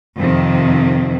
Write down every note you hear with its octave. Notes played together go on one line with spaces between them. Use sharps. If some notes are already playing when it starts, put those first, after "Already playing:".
F2 C3 D#3